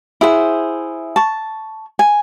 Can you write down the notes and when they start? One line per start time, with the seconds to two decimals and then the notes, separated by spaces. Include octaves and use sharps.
0.21 E4 G#4 C5 F#5
1.16 A5 C#6
1.99 G#5